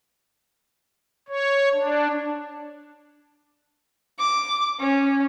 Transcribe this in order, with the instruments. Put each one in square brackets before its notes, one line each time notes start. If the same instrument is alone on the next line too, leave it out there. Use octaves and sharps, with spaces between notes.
[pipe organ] C#5
D4
[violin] D6
C#4